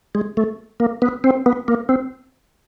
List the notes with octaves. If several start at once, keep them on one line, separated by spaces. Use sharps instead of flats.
G#3
A3
A#3
B3
C4
B3
A#3
C4